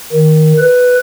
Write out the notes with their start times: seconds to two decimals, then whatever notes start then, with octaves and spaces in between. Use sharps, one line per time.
0.13 D#3
0.58 B4